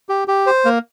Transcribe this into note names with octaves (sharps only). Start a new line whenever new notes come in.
G4
G4
C5
A#3